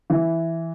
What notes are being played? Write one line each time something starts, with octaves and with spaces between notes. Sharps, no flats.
E3